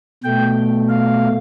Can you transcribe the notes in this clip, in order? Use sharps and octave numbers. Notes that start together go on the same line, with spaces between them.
B2 A3 G5
F5